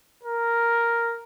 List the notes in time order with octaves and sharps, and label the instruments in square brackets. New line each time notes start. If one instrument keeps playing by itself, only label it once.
[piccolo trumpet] A#4